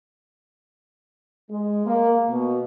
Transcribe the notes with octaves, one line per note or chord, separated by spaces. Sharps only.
G#3
A#3
B2